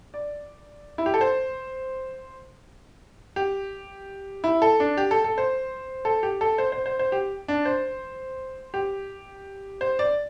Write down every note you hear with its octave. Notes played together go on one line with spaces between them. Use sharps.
D5
E4
G4
A4
C5
G4
E4
A4
D4
G4
A4
A4
C5
A4
G4
A4
C5
C5
C5
C5
G4
D4
C5
G4
C5
D5